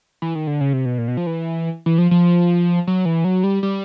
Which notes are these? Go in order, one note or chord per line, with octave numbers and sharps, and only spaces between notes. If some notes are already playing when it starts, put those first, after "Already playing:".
E3
D#3
D3
C#3
C3
B2
A#2
B2
F3
E3
E3
F3
F3
F#3
E3
F#3
G3
G3